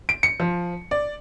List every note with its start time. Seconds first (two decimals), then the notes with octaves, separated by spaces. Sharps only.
0.09 D7
0.23 C#7
0.40 F3
0.91 D5